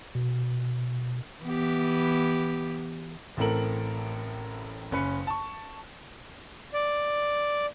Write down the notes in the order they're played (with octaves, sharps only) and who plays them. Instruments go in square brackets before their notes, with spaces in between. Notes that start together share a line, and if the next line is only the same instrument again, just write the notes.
[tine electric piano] B2
[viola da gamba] E3 B3 G4
[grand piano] A1 A2 C4 A4 A#4 F#7
F#1 C#4 B4 C#7
A5 C#6
[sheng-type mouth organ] D5